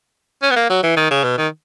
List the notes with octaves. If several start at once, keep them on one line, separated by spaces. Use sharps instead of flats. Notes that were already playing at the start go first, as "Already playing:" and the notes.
C#4
B3
A#3
F#3
E3
D#3
C#3
B2
D#3